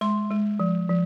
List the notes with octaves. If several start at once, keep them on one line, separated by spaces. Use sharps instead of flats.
G#3 C6
G#3
F3
F3